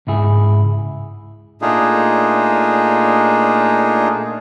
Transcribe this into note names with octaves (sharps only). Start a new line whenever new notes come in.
C#2 G#2 E4 G#4
A#2 A3 D4 D#4 F4 G#4